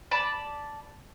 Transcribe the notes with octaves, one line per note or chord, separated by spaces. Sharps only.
D5 A5 B5